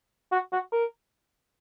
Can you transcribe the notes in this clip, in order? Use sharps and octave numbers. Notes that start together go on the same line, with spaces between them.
F#4
F#4
A#4